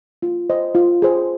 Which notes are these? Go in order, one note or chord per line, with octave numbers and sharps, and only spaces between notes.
F4
C5 D#5
F4
G#4 C5